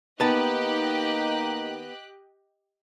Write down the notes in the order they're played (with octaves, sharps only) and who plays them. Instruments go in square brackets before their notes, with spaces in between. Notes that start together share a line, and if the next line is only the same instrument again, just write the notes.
[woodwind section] D#3 A#3 D#4 [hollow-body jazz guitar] B3 A5 [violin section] G4 D#5 F#6